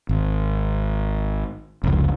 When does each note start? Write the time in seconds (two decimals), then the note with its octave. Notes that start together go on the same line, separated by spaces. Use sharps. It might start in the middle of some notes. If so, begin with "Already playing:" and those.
0.09 G#1
1.84 F1 C#2